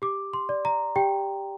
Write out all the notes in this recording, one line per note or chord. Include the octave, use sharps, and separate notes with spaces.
G4 D6
C6
D5
A#5
G4 G5